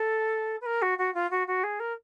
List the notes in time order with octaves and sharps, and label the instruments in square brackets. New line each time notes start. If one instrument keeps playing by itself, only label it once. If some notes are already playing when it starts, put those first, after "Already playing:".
Already playing: [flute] A4
B4
A#4
F#4
F#4
F4
F#4
F#4
G#4
A#4